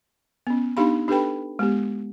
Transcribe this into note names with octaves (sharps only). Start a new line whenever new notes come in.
B3 C#4
B3 D4 D#4 G4 F5 B5
D4 G4 A4 B4 G5 B5
G#3 B3 G4